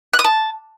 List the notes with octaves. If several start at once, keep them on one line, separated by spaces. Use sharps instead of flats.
F#6
D#6
A5